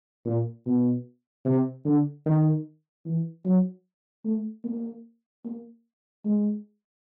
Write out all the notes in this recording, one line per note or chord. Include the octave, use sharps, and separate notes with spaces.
A#2
B2
C3
D3
D#3
E3
F#3
A3
A#3
A#3
G#3